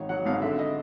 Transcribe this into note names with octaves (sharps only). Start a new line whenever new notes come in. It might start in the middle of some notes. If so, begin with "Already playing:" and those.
Already playing: G#1 D#3 C#5
F#3 F#5
G#1 F5
D3 E5
D#5